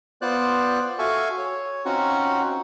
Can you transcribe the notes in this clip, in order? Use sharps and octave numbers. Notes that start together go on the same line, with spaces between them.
B3 F4 C5 D5 F#6
F#4 A4 E5 F5 G#5 C#6
C#5
C4 C#4 D#4 F4 F#4 F#5